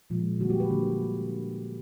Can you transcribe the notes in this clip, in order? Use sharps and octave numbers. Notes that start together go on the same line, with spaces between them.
A#2 F3 G#3
D3 G3 A#3 F#4
G4
B4
D3 G3 A#3